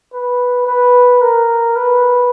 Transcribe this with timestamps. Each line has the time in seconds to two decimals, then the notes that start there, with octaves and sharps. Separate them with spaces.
0.13 B4
0.67 B4
1.21 A#4
1.76 B4